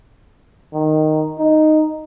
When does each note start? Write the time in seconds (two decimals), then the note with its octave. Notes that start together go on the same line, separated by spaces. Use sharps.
0.73 D#3
1.39 D#4